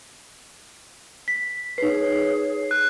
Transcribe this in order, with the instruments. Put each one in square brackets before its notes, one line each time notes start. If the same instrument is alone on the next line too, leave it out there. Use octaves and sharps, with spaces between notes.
[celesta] B6
[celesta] D#4 B4 [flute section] G#4 C#5 [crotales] C7
[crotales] F#6